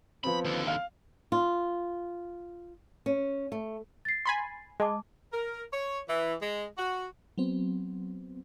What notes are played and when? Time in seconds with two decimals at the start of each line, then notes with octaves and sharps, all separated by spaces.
0.24 F3 B3 C4 B5
0.45 D#2 D3
0.67 F5 F6
1.32 F4
3.06 C#4
3.52 A3
4.05 A6 C7
4.26 G#5 B5 C6
4.80 G#3 D#5 A5 D6
5.33 A#4
5.73 C#5
6.09 E3
6.41 G#3
6.78 F#4
7.38 F#3 B3 C4